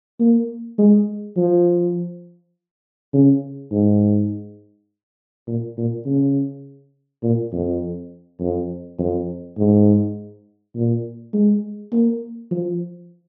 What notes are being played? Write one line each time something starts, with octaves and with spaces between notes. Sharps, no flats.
A#3
G#3
F3
C#3
G#2
A#2
A#2
C#3
A#2
F2
F2
F2
G#2
A#2
G#3
A#3
F3